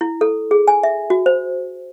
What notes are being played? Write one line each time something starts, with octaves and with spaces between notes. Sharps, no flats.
E4
A4
G#4
G#5
E5
F#4
C5